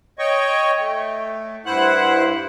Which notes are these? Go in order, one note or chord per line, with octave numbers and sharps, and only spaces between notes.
C#5 D#5 G5 C#6
A3
G2 E4 C5 F#5 F#6